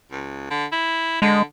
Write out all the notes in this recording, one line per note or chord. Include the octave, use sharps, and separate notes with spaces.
C#2
D3
E4
D3 G#3